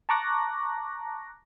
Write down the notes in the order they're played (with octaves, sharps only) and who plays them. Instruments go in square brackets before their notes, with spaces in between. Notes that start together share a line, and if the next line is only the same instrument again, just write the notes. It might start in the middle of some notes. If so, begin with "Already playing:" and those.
[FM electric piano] A5 A#5 C#6 D6 F#6 A#6